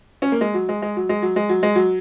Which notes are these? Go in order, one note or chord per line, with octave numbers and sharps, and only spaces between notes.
C#4
A#3
G#3
F#3
G#3
G#3
F#3
G#3
F#3
G#3
F#3
G#3
F#3